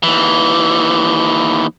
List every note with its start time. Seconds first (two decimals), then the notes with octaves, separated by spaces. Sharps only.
0.03 D#2 E3